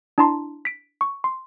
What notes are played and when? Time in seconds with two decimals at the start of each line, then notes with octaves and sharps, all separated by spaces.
0.18 D4 E4 A5 A#5 C6
0.65 B6 D7
1.01 C#6
1.24 C6